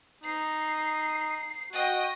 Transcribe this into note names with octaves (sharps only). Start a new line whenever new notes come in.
D#4 C7
F#4 D#5 G5